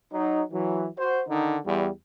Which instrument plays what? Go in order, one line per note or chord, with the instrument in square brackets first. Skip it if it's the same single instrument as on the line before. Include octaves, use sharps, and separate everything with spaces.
[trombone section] F#3 D#4
E3 F#3
F#4 C5
D3 D#3 D#4
E2 G3